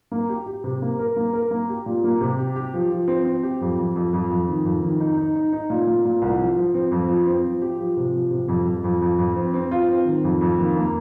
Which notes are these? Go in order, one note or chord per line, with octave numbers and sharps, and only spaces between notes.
A#3
G4
G4
C3
A#3
A#4
A#3
A#4
A#3
G4
A#2
A#3
C3
G4
G4
F3
F3
C4
C4
G4
F2
F2
F2
F2
F2
D#3
F2
D#3
D#4
D#4
D#4
D#4
A#2
A#2
A#2
C2
F3
F3
C4
F2
F3
C4
F3
G4
F3
C3
F3
C3
F2
F2
F2
F2
F2
C4
C4
F4
C4
D#3
F2
F2
D#2
A#3